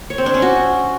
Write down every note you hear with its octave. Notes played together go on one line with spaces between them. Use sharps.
C#5
C4
D4
C#4
F#4